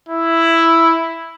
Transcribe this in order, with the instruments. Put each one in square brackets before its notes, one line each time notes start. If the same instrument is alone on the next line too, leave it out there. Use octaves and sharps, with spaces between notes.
[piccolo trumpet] E4